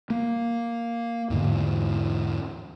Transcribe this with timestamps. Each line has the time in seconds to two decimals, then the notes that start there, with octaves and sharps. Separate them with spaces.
0.10 A#3
1.30 E2 G#2 D3